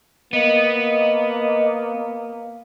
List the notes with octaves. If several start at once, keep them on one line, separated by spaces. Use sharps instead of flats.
A#3 B3 D#5